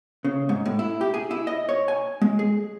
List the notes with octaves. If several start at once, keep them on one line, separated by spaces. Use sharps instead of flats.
C#3
G#2
A2
E4
G4
G#4
E4
D#5
C#5
G#5
G#3
G#4